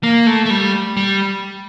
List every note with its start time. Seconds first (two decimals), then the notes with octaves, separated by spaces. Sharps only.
0.03 A#3
0.27 A3
0.46 A3
0.50 G3
0.97 G3